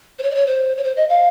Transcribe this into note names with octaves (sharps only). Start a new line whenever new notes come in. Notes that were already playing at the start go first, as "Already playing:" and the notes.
C5
C#5
D5
C#5
C5
C#5
C5
D#5
F5